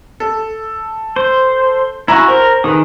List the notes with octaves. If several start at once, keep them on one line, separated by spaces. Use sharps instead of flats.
A4
C5
E4 F#4 G#5 A#5 A#6
A#4 C5
D#3 G#4 B4 D#6